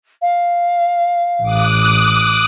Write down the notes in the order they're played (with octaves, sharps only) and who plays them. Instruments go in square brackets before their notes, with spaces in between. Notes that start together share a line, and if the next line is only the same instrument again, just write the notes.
[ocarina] F5
[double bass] A1 [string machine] D6 D#6 F#6